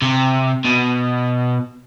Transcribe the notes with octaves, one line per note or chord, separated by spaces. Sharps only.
C3
B2